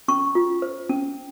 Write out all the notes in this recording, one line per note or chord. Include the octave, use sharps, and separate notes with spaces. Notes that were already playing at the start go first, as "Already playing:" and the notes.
C#4 C#6
F4
C5
C#4